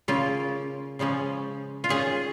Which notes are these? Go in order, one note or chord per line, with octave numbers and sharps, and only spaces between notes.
C#3 A#3 C#4 F4
C#3 F3 G#3 C#4
F4
D#3 C#4 G#4